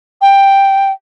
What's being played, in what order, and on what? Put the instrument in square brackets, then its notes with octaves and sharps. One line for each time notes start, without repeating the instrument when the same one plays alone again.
[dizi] G5